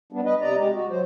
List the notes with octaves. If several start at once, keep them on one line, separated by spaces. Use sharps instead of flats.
G3 B3 D4
B4 D#5
C3 D5 D#5 A#5
G#3 G4
F#4
F#3 C5